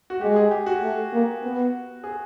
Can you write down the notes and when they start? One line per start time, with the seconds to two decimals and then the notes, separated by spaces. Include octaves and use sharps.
0.10 F#4
0.21 G#3 G4
0.36 G#4
0.51 G4
0.66 F#4
0.82 A3
1.12 A#3
1.43 B3
2.04 G#4